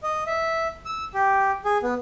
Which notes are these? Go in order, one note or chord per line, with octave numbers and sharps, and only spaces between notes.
D#5
E5
E6
G4
G#4
B3